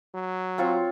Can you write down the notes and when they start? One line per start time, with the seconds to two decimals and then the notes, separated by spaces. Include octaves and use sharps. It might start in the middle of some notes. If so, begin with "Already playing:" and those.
0.14 F#3
0.58 C4 F4 C#5